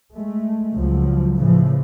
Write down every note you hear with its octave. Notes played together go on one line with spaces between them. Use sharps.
G#3 A3
C#2 F3 F#3
A2 C#3 E3 F3